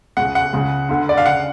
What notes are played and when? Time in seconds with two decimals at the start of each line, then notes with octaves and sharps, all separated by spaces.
0.17 C#2 C#3 F#5
0.35 F#5
0.53 C#2 C#3
0.89 D2 D3
1.09 D5
1.18 F5
1.26 C#3 F#5